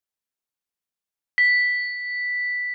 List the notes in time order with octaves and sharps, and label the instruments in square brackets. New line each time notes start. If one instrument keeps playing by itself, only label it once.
[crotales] B6